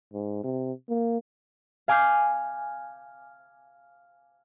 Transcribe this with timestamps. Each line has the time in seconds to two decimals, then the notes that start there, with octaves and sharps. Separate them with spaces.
0.13 G#2
0.44 C3
0.89 A#3
1.88 F5 G#5 D6 F6 G6 C7